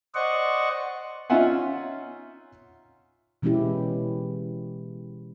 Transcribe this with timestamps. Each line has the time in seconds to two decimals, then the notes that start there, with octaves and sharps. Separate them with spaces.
0.15 C5 D5 D#5 F#5 C#6
1.30 C#4 D#4 F4 E5 F#5 G#5
3.42 B2 E3 G#3 C#4 E4 G4